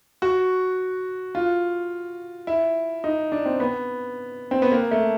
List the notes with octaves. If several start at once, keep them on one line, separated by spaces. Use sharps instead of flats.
F#4
F4
E4
D#4
D4
C4
B3
C4
B3
A#3
A3